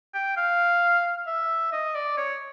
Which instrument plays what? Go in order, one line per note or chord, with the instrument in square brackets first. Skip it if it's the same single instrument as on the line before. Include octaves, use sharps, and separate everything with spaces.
[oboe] G5
F5
E5
D#5
D5
C#5